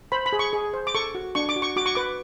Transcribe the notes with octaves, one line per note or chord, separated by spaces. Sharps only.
C5 B5
B5
G#4
C#6
G#4
C5
D6
A4 C#6
F#4
D4 C#6
D6
F#4
C#6
F#4 D6
C#6
B4 D6